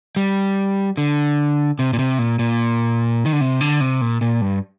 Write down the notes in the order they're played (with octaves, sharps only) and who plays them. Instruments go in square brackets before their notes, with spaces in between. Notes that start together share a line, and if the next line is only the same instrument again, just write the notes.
[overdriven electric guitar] G3
D3
C3
A#2
C3
A#2
A#2
D#3
D3
C3
D3
C3
A#2
A#2
G2